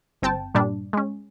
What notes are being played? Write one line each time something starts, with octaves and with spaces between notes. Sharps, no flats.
G1 C4 G5 A5
G2 A#2 G3 D4
G#3 C#4